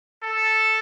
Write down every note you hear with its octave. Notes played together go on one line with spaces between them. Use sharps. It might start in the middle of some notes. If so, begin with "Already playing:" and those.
A4